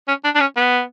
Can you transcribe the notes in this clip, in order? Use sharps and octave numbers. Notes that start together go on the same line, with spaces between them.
C#4
D4
D4
C#4
B3